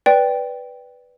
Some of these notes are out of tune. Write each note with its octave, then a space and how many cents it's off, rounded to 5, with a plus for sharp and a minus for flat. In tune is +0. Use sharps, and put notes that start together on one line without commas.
B4 +0 D5 -5 G5 +0